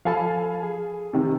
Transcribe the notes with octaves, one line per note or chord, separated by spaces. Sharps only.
F3 A4 F5 G#5 A5 B5
G#4
C3 D#3 C4